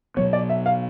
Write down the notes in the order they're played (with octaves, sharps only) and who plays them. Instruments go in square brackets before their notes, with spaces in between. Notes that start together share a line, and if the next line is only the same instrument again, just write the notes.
[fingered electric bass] B2 F#3 B3 [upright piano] C#5
[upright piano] D5
E5
F5